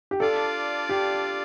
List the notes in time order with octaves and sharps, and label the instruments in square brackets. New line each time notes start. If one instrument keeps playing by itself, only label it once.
[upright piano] G4
[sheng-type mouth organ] D4 F4 D5 F5 A5 [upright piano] A4
[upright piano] G4